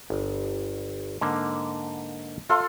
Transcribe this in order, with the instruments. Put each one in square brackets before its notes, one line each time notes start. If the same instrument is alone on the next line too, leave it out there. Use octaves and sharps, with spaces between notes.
[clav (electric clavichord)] G1
G#2 D3 A#3
[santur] F4 A4 C6 [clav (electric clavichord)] E5